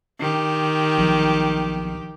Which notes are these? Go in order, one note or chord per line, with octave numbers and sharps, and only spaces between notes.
D#3 G4
B1 F3